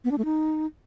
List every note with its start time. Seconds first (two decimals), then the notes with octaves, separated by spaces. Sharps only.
0.04 B3
0.11 D4
0.18 A3
0.25 D#4